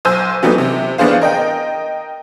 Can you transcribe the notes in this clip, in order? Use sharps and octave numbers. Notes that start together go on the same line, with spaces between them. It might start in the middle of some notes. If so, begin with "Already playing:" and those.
B1 C5 G#5 E6 G6
E3 F#3 A3 B3 C4 D#4
C3
A1 B3 D4 G#4 C5 F5
A#4 D#5 G5